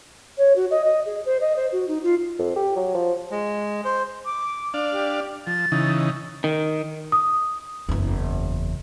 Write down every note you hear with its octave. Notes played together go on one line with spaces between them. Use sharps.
C#5
F#4
D#5
D#5
G#4
C5
D#5
C5
F#4
D#4
F4
F2
G4
F#3
F3
G#3
C5
D6
D4 D5 F5
G4
F3 A6
C#3 E3 D#4
D#3
D#6
F#1 E2